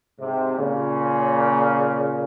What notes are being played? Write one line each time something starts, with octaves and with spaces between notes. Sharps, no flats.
G#2 C3
A#2 C#3